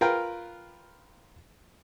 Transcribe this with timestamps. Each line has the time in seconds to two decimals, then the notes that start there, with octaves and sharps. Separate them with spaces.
0.01 F4 A#4 B4 G5